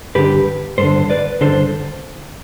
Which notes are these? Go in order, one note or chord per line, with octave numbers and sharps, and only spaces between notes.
G2 D3 G4 B4
G2 D3 A4 C5
B4 D5
G2 D3 A4 C5